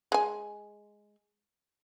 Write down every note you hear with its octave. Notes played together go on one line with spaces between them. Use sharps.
G#3 G#5